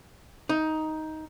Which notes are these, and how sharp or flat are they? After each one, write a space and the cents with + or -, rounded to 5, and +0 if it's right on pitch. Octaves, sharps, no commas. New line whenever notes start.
D#4 +10